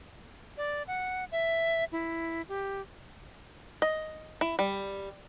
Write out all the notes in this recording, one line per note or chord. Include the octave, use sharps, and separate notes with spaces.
D5
F#5
E5
E4
G4
D#5
E4
G3